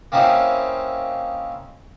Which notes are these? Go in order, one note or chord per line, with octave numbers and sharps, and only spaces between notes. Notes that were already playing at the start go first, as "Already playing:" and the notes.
A#3 C4 C#4 D#4 E4